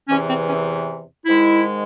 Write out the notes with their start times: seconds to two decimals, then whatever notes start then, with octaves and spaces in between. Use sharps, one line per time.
0.08 E2 C3 E3 C#4
0.28 C4
0.47 C#4
1.25 G#2 D#3 G#3 E4